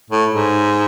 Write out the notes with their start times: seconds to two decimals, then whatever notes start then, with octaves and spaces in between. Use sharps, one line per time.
0.10 A2
0.32 G#2